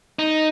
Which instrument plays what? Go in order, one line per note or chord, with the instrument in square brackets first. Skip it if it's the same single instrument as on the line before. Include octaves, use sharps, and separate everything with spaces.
[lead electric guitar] D#4